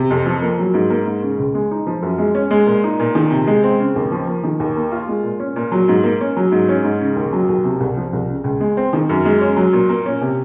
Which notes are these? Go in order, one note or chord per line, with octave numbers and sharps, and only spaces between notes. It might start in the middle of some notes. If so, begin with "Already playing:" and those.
Already playing: C3
F2
F3
A#3
F#3
G#2
A#3
G#2
C#3
C#2
G#3
D#4
F3
F#2
G#3
C#4
G#3
A#2
D#4
A#2
D#3
C3
G#3
C4
C#3
D#2
F3
A#3
D#3
D#2
A#3
F4
G#3
A#2
C#4
A#2
F#3
G#2
A#3
C#4
F#3
G#2
C#4
G#2
C#3
D#2
F#3
D#2
C3
C2
F3
C2
C#3
C#2
G#3
C4
D#3
F#2
G#3
C#4
F#3
A#2
A#3
C#4
C3